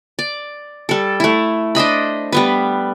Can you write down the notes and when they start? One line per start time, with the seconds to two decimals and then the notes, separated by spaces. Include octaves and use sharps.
0.19 D5
0.89 G3 A4
1.20 A3 E4
1.75 D4 C5 D#5 B5
2.32 G3 B3 B4